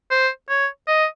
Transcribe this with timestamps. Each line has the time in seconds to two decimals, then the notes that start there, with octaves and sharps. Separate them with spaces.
0.11 C5
0.49 C#5
0.88 D#5